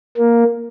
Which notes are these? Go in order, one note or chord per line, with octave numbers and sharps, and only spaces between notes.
A#3